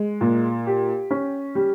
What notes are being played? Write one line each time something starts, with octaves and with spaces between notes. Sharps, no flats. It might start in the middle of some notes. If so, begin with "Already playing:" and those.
Already playing: G#3
A#2
G4
C#4
G3